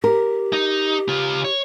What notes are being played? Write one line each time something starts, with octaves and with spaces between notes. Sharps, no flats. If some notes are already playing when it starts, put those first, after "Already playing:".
G4 A#4
D#4
C#3 F4
C#5